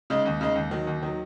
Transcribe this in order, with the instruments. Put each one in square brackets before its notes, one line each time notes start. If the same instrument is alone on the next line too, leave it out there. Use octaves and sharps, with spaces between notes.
[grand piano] C#3 G#3 D#4
D#2
C#3 G#3 D#4
D#2
D#3 F#3
D#2
D#3 F#3